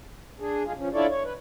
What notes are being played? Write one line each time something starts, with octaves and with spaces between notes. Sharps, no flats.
D4 G#4
G#3 F4 G#4
F3 C#4
D4 E4 F4 A4 C#5 D5
C#5
B4